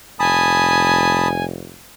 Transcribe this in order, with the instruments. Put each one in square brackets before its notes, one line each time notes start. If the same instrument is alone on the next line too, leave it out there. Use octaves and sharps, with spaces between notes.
[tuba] F1 [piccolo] G#5 [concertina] A5 B5 D#6